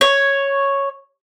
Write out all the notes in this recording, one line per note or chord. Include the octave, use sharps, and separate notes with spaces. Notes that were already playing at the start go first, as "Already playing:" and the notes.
C#5